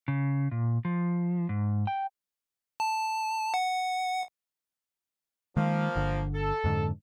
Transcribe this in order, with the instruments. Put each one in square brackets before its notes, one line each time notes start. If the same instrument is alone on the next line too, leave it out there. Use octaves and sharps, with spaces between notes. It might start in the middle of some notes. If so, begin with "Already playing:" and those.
[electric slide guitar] C#3
A#2
F3
G#2
G5
[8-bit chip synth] A5
F#5
[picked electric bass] D#3 G#3 [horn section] F3 A#3
[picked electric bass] G1 D3
[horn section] A4
[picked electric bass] F2 G#2 D3